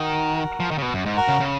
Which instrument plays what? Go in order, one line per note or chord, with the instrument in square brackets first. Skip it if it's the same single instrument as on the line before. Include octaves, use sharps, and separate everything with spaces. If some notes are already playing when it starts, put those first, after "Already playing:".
Already playing: [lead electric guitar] D#3 [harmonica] F#4 A#4
[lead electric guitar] F3
D#3
C#3
B2
F#2
G#2
[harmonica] F#4 A#4
[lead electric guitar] C#3
C#3